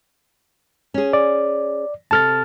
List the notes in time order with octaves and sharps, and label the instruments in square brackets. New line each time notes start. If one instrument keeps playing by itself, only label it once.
[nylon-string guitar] C#4 G#4
[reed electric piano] D5
[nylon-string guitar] C3 A4 [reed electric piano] A5 F6 A6